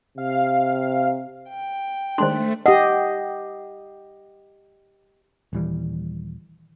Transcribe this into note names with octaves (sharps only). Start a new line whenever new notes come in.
C3 F5
G5
D#3 G#3 A3 D4 C5 C6
G4 D#5 F#5
D#1 E3 G3